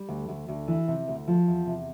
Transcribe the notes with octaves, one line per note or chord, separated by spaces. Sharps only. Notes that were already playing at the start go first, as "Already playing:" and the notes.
Already playing: G3
D2
D2
D2
E3
C3
D2
F3
E2
C3